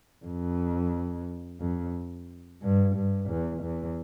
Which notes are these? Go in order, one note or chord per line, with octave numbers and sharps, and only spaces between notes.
F2
F2
G2
G2
E2
E2